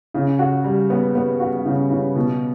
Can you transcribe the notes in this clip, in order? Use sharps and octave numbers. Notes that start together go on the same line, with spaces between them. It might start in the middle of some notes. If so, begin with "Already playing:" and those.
C#3
F#4
G3
B3
B3
F#4
C#3
C#3
B2